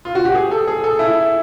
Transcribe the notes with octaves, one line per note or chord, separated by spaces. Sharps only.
F4
F#4
G4
G#4
A4
G#4
A4
E4